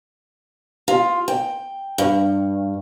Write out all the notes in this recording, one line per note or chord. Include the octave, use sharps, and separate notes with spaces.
F4
G5
G2